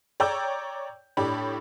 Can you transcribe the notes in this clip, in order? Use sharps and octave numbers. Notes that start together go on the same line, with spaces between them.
C#5 D5 G5 A#5 E6 G6
A2 D4 G4 C#5 B5